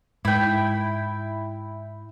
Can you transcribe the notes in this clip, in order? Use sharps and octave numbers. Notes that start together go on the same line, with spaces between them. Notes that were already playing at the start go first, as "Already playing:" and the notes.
G#2 E4 G5